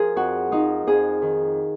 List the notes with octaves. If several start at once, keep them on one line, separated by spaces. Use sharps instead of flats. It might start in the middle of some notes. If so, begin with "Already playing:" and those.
Already playing: F3 G#4 A#4
F2 F#4
F3 D#4
F2 G#4
D#3